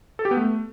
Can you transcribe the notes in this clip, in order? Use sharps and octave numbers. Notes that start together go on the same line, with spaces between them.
A4
G4
B3
A3